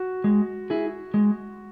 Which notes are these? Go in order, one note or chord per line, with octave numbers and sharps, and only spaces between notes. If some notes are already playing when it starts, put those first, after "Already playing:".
Already playing: F#4
G#3
E4 G#4
G#3